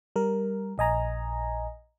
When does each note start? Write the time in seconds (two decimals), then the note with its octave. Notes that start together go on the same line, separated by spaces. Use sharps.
0.16 G3 A#4
0.78 A#1 D#5 G#5 A#5